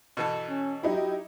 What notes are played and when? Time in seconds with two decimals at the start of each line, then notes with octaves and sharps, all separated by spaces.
0.17 B2 E3 A4
0.49 C#4
0.83 F#3 D#4 E4 G4